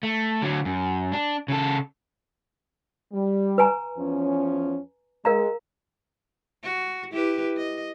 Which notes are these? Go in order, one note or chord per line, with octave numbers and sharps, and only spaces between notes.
A3
D3 F#3
F#2
D4
C#3 A4
G3
B4 G#5 A#5
E2 F3 C#4
G#3 A#4 F5 A#5
F#4
E4 G4 B4
D#5